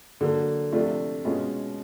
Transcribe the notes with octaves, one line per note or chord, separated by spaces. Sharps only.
D3 F#3 A#3
C3 F3 A3 D4 F4
B2 G#3 C#4 F4